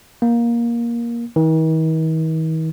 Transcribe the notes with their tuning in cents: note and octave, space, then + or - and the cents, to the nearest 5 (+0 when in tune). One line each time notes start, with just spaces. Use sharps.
A#3 +15
D#3 +45